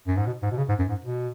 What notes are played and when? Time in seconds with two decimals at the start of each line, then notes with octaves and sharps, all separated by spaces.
0.07 F#2
0.17 G#2
0.27 B2
0.43 G#2
0.51 B2
0.58 C#3
0.69 G#2
0.79 F#2
0.89 G#2
1.05 B2